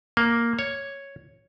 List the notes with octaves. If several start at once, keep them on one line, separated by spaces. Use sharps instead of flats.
A#3
C#5